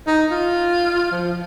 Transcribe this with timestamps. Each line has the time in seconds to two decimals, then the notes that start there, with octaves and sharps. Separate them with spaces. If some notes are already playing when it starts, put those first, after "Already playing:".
0.07 D#4
0.31 F4
1.12 F3